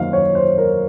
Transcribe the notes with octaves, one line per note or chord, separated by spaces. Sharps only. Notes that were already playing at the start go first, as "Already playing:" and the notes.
Already playing: F#2 D#3 A#3 D#4 F5
C#5
C5
A#4